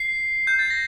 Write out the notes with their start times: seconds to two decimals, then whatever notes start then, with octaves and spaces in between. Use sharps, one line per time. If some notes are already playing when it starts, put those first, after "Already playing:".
Already playing: C7
0.47 G6
0.59 A6
0.70 A#6